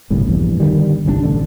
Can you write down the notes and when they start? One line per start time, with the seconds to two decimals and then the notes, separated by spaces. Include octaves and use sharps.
0.10 G1 C2 A2
0.27 A#1 E2 G2
0.60 D3 D#3 G3
1.05 G1 C2 B2 D4
1.22 A1 D3